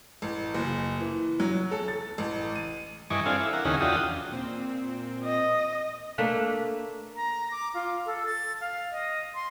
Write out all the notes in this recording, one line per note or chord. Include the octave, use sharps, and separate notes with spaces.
A1
F#1
E3
F#3
A4
A6
A1
D#7
G2 E3 D#5 G#5 C#6 D6
C4 D4 A4 F5 G#5
E4
A#4 F#5
D#2 C#3 E3 C#4 D#4 G#4
E2 D4 F4 F#4 G5 D#6
A#2 C4
D#5
A3 A#3 D4 B4
A#5
D6
F4
A4
A6
F5
D#5
C6